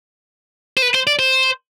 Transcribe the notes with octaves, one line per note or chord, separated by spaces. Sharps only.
C5
B4
C5
D5
C5